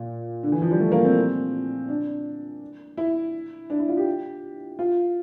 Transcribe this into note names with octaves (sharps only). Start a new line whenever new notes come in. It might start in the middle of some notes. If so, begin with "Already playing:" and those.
Already playing: A#2
D3
E3
F3
G3
A3
A#3
C4
D4
E4
D4
E4
F4
G4
F4